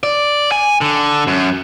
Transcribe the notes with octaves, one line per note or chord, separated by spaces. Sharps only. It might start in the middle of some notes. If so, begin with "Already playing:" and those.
D5
G#5
D3
F#2